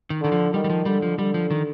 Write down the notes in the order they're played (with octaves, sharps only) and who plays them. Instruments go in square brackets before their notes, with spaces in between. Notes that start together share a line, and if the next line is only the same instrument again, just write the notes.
[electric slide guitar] D#3
[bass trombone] D3 [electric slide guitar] D#3
[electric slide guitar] F3
[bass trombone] D#3 [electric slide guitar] G3
[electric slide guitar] G3
F3
[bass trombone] D3 [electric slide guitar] G3
[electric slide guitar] F3
[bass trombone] D3 [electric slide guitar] G3
[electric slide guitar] F3
D#3